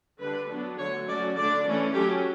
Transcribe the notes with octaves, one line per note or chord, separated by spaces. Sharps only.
D3 G3 D4 B4
F#3 B3 D4
D3 F#3 A3 C#5
F#3 A3 C#4 D5
D3 A3 D4 D5
E3 A3 C#4
F#3 A3 C#4 G4